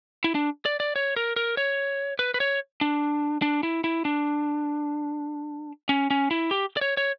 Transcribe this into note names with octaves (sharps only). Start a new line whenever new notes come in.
E4
D4
D5
D5
C#5
A#4
A#4
C#5
B4
B4
C#5
D4
D4
E4
E4
D4
C#4
C#4
E4
G4
D5
C#5
C#5